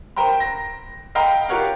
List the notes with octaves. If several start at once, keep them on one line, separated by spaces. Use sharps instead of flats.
A#4 C5 G5 A#5 B5
A#6
D#5 F5 G5 A#5 B5
F4 G4 A#4 C#5 F5 F#5